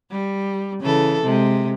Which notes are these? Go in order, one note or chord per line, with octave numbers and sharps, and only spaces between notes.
G3
C#3 E3 A4
C3 G#3